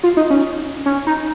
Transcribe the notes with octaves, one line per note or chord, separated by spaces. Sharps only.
F4
D#4
C#4
C#4
D#4